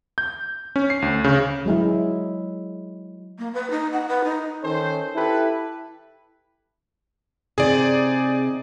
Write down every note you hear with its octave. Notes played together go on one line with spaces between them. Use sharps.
G6
C#4
C7
D2
C#3
F#3 G#3 E4
A#3
B4
D#4
F#5
B4
D#4
D#3 C#4 A4 C5
E4 G4 A4 B4
C3 D#4 G#4 D5